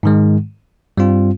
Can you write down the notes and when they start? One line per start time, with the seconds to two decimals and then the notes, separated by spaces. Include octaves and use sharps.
0.03 G#2 D#3 G#3
0.97 G2 G3 C4 F4